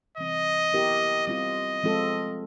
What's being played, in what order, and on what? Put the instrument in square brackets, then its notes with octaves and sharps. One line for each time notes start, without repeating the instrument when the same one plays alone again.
[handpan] C3 E3 G3 C4 [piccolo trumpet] D#5
[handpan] F#3 B3 E4 G4 A#4
[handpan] G3 C4 F4 [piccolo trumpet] D#5
[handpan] F3 G#3 C4 F4 A4